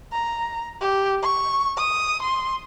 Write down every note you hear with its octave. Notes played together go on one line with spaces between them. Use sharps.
A#5
G4
C#6
D#6
C6